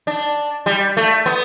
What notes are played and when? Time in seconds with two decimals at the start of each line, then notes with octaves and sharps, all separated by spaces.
0.07 D4
0.66 G3
0.97 A3
1.26 B3